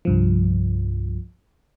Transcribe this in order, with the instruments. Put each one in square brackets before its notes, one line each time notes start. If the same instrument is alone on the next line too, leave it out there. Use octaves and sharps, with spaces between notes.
[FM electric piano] C2 G2 F3